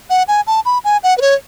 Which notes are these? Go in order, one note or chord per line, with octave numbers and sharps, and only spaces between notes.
F#5
G#5
A5
B5
G#5
F#5
B4
C#5